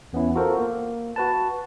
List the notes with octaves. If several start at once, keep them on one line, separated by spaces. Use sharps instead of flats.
E2 B3 C#4 E4
F4 F#4 A4 A#4 C5
A#3
F#4 B4 A5